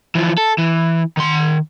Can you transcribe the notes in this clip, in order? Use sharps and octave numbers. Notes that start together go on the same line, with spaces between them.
E3 F3
A4
E3
D#3 C6